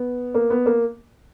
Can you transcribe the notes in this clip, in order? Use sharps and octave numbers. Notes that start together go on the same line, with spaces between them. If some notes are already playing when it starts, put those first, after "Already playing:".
Already playing: B3
A#3
B3
A#3